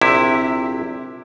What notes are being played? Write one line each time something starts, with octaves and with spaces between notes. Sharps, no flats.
A#1 C3 E4 G4